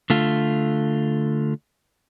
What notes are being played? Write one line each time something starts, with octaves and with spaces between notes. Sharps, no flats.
D3 A3 F4